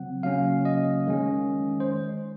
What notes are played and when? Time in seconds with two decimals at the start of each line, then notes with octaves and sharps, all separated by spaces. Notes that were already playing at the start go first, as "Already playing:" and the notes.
Already playing: C#3 F#3 C4 F#5
0.23 C#3 F#3 A#3 C#4 F5
0.65 D#5
1.07 D#3 G#3 C#4
1.80 C5